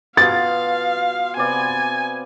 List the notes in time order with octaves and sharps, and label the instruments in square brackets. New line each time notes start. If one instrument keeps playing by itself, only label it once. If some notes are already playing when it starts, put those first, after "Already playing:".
[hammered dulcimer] B2 F4 F#5 [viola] F5 [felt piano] A6
[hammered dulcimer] C3 B3 D5 [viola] G#5